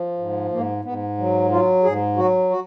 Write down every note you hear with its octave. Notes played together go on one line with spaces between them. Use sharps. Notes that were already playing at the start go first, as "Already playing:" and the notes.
Already playing: F3
G#2
G#2 A#3
G#2 B3
F#3
F#3 F4
G#2 G#4
F#3 F#4
F#4